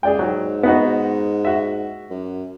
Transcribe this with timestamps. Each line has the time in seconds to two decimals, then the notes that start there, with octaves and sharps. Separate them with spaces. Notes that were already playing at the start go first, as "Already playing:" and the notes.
0.03 C#2 G#4 D5 G5
0.19 G#2 F#3
0.63 B3 D#4 F#4
1.45 F#4 E5
2.10 F#2